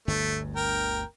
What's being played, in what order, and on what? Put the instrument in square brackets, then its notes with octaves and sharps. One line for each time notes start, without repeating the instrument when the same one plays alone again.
[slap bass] G1 D2 G2 [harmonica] A3
[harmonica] A#4 G5